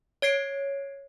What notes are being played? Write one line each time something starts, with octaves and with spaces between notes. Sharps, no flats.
C#5 G#6 C7 D7